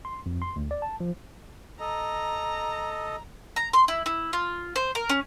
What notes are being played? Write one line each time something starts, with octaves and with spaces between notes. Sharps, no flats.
C6
F2
C6
D2
D5
A5
F3
A4 D#5 A#5
A#5
C6
E4
E4
F4
C5
A#4
C#4